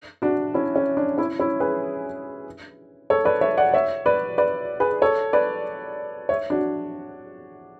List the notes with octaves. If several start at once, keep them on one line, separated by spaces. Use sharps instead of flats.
D4 F#4
C#4 E4
C#4
D4
C#4 E4
C#4 E4
G#4 B4
A4 C#5
B4 D5
C#5 E5
D5 F#5
C#5 E5
B4 D5
B4 D5
G#4 B4
A4 C#5
B4 D5
C#5 E5
D4 F#4